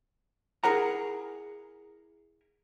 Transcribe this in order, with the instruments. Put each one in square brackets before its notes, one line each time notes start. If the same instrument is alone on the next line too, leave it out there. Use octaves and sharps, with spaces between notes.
[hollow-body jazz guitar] E4 G#4 A#4 F#5 A#5